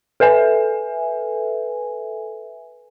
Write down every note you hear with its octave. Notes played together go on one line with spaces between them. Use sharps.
A4 B4 E5 G#5